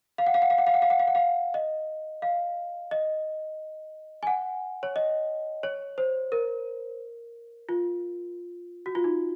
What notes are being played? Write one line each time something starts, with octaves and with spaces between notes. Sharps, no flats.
F5
F#5
F5
F#5
F5
F#5
F5
F#5
F5
F#5
F5
F#5
F5
D#5
F5
D#5
G#5
F#5
C#5
D#5
C#5
C5
A#4
F4
F#4
F4
D#4